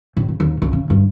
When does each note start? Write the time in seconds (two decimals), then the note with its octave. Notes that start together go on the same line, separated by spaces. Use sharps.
0.17 A1
0.28 C#3
0.40 D#2
0.62 C#2
0.73 C#3
0.90 G2